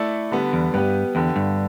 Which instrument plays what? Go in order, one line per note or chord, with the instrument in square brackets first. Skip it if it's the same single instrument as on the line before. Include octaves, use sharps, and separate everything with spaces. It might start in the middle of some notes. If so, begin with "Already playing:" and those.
Already playing: [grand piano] A3 E4 A4 D5
D3 G3 B3
[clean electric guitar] E2
[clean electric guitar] G2 [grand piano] G3 B3 G4 B4
[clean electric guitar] E2 [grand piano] D3 B3 G4
[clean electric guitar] G2